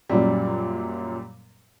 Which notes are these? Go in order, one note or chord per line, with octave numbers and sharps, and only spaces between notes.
F#2 A#2 F#3 G3